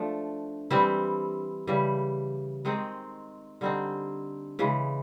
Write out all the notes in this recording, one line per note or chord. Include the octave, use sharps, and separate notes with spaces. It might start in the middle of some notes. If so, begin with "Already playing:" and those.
Already playing: F3 A3 D4
E3 G3 C4 E4
C#3 E3 G3
D#3 G#3 C4 D#4
D3 G3 C4 D#4
C#3 E3 G#3